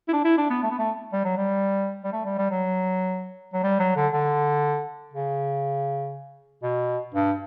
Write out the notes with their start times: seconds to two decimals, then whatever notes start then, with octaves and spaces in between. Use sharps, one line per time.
0.08 E4
0.13 D4
0.25 E4
0.37 D4
0.50 B3
0.63 A3
0.71 B3
0.79 A3
1.13 G3
1.24 F#3
1.37 G3
2.04 G3
2.13 A3
2.25 G3
2.38 G3
2.51 F#3
3.53 F#3
3.63 G3
3.79 F#3
3.96 D3
4.13 D3
5.14 C#3
6.63 B2
7.14 G2